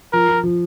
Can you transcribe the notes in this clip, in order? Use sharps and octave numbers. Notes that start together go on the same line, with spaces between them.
F3 A#4
F3
F3